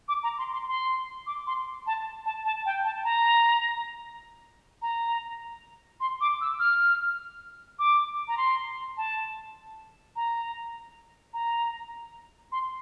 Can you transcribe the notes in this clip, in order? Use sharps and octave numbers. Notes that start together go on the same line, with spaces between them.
D6
A#5
C6
C6
C6
D6
C6
A5
A5
A5
G5
A5
A#5
A#5
C6
D6
E6
F6
D6
A#5
C6
A5
A#5
A#5
C6